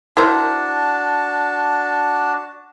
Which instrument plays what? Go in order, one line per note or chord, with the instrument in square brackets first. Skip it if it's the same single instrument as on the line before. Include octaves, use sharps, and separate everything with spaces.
[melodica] D4 F#4 A5 [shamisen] E4 A#4 C5